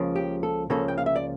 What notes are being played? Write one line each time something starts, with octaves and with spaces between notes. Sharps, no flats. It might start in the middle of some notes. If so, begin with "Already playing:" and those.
Already playing: C#2 C#3 F3 A#3
G4
A4
C#2 C#3 F3 A#3 A4
G5
F5
E5
D5